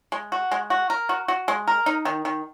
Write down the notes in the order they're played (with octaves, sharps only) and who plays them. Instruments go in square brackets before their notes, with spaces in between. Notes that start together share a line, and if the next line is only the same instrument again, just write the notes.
[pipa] G#3
F#4
G#3
F#4
A#4
F#4
F#4
G#3
A#4
D#4
D#3
D#3